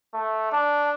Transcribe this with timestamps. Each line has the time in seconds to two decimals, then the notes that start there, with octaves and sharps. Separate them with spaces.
0.14 A3
0.52 D4